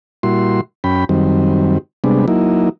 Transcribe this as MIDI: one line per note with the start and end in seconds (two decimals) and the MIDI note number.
0.23 0.61 46
0.23 0.61 55
0.23 0.61 64
0.23 0.61 66
0.23 0.61 84
0.84 1.05 42
0.84 1.05 61
0.84 1.05 79
0.84 1.05 83
1.09 1.78 42
1.09 1.78 51
1.09 1.78 55
1.09 1.78 60
2.04 2.26 48
2.04 2.26 55
2.04 2.26 56
2.04 2.26 59
2.04 2.26 62
2.28 2.69 54
2.28 2.69 58
2.28 2.69 63
2.28 2.69 64